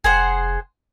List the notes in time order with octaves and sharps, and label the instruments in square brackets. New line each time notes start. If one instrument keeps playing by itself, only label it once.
[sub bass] F1 [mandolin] G#4 C5 F#5